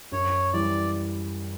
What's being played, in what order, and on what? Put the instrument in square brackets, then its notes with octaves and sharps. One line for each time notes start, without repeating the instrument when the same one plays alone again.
[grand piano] F#2 [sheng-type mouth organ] C#5
[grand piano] E3 G3 [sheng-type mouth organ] D5